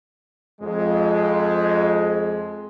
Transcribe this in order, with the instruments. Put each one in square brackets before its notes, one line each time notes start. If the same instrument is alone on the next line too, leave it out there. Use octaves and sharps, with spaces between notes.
[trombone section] F2 G#3